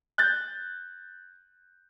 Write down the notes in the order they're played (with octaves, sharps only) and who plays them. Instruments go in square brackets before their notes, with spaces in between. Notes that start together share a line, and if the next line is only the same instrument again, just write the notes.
[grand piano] F#6 G6 A6